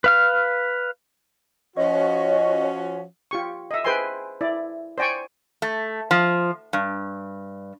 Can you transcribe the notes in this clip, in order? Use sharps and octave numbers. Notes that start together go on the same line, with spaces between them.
B4 F5 F6
F3 C#4 F#4 C#5 D#5
F4 G4 C#6
D#5 E5
G#4 B4 C5 G5 G#5 C6
E4 D5
C5 D5 G5 G#5 C#6
A3
F3
G2